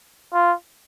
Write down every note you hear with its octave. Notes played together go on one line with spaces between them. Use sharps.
F4